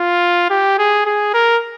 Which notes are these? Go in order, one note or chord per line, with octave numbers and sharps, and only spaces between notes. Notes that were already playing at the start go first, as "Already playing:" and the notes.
Already playing: F4
G4
G#4
G#4
A#4